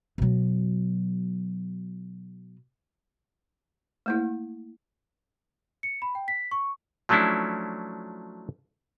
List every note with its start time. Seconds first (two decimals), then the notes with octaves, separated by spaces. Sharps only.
0.18 B2 F#3
4.06 A3 A#3 E4
5.83 C#7
6.02 B5
6.15 G5
6.28 B6
6.51 C#6
7.09 F3 F#3 A3 C#4 D4 E4